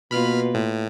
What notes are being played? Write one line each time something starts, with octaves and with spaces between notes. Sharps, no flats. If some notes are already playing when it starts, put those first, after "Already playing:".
B2 A#3 F4 B4 B5 F6
A2